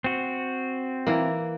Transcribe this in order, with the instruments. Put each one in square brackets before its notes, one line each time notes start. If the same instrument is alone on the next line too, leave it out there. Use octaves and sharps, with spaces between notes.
[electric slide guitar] C4 F#4
[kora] E3 A#3